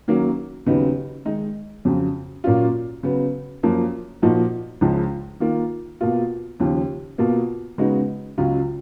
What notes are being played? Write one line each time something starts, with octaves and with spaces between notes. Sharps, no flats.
D#3 F#3 A#3 C#4
D#2 C#3 F#3 B3 D#4
D#3 G#3 D#4
F2 C#3 F#3
A#2 F#3 A#3 C#4 F4
C#3 F#3 B3
F#2 F3 A#3
A#2 F3 A#3 D#4 F#4
C#2 C#3 F3 G#3
D#3 A#3 F4
B2 A#3 F4
D#2 C#3 F3
B2 A#3 F4
C#3 G#3 B3 D#4 F#4
C#2 C#3 F#3 C#4 F4